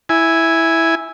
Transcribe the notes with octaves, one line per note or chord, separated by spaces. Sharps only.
E4 G#5